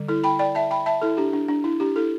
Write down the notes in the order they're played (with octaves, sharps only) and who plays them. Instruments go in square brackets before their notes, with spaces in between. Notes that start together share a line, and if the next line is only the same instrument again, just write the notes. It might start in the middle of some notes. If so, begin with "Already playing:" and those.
Already playing: [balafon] D3 G3
E4 A4
G5 B5
D5 G5
E5 A5
G5 B5
E5 A5
E4 A4
D4 G4
D4
D4
E4
D4 G4
E4 A4